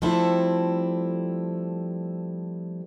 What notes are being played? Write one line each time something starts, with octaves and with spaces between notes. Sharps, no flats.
F3 G3 A3 C4 E4 A4